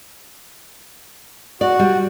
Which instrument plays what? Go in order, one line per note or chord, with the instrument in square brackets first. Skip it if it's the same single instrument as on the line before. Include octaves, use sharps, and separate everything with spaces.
[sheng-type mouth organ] F#4 [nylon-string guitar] D5
[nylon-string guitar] G3